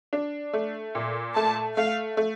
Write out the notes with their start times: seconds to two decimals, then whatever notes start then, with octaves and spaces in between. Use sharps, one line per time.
0.13 D4
0.53 A3
0.95 A#2
1.35 A3 A5
1.77 A3 F5
2.17 A3